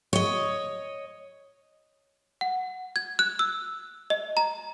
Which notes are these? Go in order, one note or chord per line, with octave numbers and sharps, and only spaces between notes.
C#5 D#5
F#5
G#6
F#6
E6
D#5
A#5